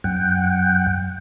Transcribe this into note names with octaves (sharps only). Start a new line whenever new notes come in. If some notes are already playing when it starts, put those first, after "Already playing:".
F#2 F#5 G5